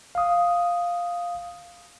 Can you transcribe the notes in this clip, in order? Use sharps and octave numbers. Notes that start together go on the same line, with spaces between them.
F5 D#6